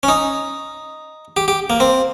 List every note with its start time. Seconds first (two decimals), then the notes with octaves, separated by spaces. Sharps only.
0.03 C#4
0.08 D#4
1.37 G4
1.48 G4
1.70 A#3
1.80 C4